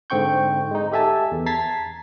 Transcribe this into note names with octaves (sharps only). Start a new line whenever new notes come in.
G#2 D3 C4 G5 C#6 G6
G#3 D#4
G4 A4 E5 G#5 A5
E2
A5 A#5 G#6 A6 B6 C7